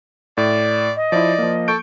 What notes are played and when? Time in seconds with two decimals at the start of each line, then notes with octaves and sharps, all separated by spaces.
0.38 A2 D5
0.96 D#5
1.12 F3 E4 D5
1.39 F3 A#3
1.68 A4 C#6 G6 D7